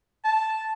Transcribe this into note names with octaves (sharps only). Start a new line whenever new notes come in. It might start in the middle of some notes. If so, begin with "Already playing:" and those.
A5